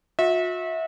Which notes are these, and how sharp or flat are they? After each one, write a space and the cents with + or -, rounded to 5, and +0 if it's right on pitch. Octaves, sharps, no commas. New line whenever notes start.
F#4 -45 E5 -25